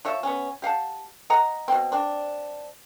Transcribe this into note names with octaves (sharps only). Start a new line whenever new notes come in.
F3 C#5 E5
B3 C#4
G4 F5 F#5 A5
D#5 F#5 A#5
B2 C4
C4 D4